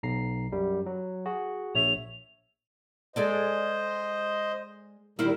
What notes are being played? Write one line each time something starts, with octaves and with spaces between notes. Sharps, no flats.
B1 A#5 C7
F#2 G3
F#3
F#4 G#4
A#1 C#5 E5 F7
G#3 A4 C5 D5 D#5
A#2 D#3 G3 E4 A#4 C5